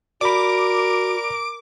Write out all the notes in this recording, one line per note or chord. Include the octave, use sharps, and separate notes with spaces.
F#4 A#4 D5 B5 D6